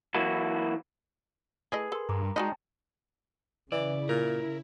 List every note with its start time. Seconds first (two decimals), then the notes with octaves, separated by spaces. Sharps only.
0.14 E3 F#3 A#3 E4 F#4
1.72 A3 E4 G#4 B4 D#5
1.92 A4 A#4 C6
2.09 G2 A#5 D6
2.36 G#3 D#4 F#4 D5 D#5 G5 A5 A#5
3.72 C#3 E3 E4 D5
4.09 A#2 A#4